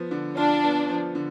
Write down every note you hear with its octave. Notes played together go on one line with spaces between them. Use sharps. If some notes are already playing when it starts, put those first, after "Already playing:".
Already playing: F3 B3
D3
D4 F4
B3
F3
D3